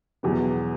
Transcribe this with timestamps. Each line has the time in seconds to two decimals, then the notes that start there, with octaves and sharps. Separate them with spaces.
0.23 E2 B2 F#3 B3